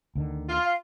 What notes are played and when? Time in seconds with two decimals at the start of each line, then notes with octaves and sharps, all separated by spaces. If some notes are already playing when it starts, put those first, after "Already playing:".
0.15 D2 D3 D#3
0.49 F4
0.65 F5